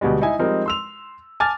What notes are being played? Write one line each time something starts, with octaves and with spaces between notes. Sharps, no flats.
D2 B2 G3 G#3
D#4 E4 G#5
F3 G3 G#3 C4 D#4 A#4
C6 E6 F7
G#5 A5 D6 F6 A6